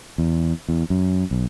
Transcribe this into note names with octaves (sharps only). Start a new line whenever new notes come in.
E2
E2
F#2
B1